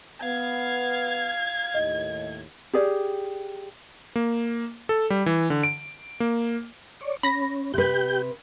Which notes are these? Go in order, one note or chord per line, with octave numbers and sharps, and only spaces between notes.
B3 F5 G#6
D#2 A2 D#5
G4 G#4 D5
A#3
A4
G3
E3
D3
D7
A#3
C#5 D5
C#4 B5 A#6
C3 G4 B4 G6